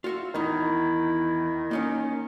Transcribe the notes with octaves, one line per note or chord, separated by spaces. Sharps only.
F4 F#4 E5
E2 D#3 D#4 E4
A#3 C#4 D#4 C#5